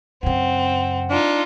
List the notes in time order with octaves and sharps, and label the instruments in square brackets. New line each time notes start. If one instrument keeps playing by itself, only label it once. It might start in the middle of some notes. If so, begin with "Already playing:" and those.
[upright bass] F#2 C#3 [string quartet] C4 [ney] F#5
[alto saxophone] D4 [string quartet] D#4 F4